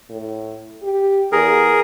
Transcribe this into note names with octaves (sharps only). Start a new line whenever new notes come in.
A2
G4
E2 G#4 A#4